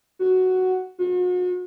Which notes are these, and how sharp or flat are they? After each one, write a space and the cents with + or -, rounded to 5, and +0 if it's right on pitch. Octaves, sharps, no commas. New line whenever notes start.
F#4 +5
F#4 -40